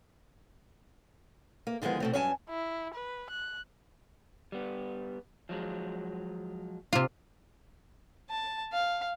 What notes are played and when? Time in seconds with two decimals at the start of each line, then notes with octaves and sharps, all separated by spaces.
1.67 A#3
1.82 D3 D#3 F3 G#3 B3
2.00 B2 A3 C4
2.13 G2 F#3 C#4 G#5 A5
2.50 E4
2.94 B4
3.30 F#6
4.52 G3 B3
5.49 F3 F#3 G#3
6.93 C3 F4
8.29 A5
8.73 F5